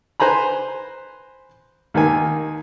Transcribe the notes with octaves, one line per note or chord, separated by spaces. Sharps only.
B4 C5 G#5 A#5 B5
D#2 D#3 A#3 G#5